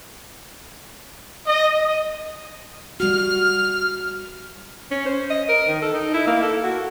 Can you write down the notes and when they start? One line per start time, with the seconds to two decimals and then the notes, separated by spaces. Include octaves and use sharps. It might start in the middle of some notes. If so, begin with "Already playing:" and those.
1.47 D#5
3.00 G3 F#4 F6
4.91 C#4
5.06 C5
5.30 D#5
5.49 A#4
5.68 D#3
5.82 A4
5.94 D#4
6.14 E4
6.27 A#3
6.43 A4
6.64 F#4